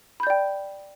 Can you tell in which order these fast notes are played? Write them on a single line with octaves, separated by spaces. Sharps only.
B5 G6 D5 G5